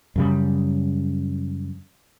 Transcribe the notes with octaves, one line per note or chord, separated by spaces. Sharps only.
F#2 C#3 G3